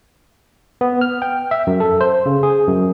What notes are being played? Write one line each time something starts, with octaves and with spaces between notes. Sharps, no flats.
B3
F6
G5
E5
F#2
A4
C5
C#3
G#4
F#2